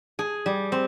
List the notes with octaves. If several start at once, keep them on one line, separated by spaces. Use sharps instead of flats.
G#4
G3
C4